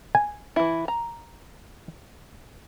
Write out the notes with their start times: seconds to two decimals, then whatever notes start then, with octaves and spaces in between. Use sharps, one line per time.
0.15 G#5
0.56 E3 E4
0.88 A#5